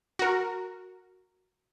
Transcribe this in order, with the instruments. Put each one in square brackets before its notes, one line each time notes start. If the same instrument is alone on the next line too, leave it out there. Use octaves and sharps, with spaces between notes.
[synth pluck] F#4 A#4